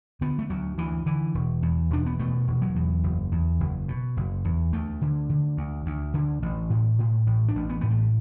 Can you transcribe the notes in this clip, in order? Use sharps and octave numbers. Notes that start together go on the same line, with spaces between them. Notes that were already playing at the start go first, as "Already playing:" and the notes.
D3 B3
A3
D2 F#3
D2 E3
D3 E3
E1
E2
E1 D4
B3
B2 A3
E1
F#3
E2
F#1
E2
F#1
B2
F#1
E2
D2 A3
D3
D3
D2
D2
D3
A1
A2
A2
A1
D4
A1
B3
A2 B3
A3